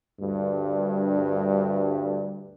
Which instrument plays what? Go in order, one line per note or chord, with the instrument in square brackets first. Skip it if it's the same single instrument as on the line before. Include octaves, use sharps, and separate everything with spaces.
[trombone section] D2 G2